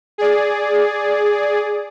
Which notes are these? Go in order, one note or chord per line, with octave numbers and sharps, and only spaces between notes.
G#4 D5